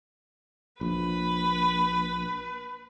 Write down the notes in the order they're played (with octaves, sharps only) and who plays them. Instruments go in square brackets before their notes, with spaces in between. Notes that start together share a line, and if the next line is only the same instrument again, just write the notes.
[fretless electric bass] A#1 [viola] B4